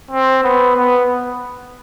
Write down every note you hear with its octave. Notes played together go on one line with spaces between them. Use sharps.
C4
B3
B3